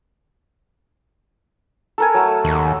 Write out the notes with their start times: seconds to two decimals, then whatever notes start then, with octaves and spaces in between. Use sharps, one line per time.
1.98 A4 A#4 G#5
2.14 F#3 A3
2.44 D#2